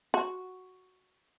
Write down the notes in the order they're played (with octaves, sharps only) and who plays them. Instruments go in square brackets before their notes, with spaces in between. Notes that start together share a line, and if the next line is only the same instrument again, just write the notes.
[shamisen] F#4